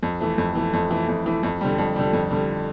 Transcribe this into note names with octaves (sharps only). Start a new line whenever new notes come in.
F2
E3 A3
F2
E3 A3
F2
E3 A3
F2
E3 A3
F2
D3 G3
F2
D3 G3
F2
D3 G3